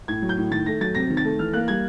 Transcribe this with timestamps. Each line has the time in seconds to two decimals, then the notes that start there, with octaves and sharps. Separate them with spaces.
0.08 A2 G#6
0.22 F#3
0.29 G6
0.37 A2
0.51 D#3 A6
0.66 A3 A#6
0.80 F#3 A6
0.95 C3 A#6
1.10 D#3
1.17 A6
1.24 A3
1.39 E3 F6
1.53 A#3 F#6
1.68 G3 G#6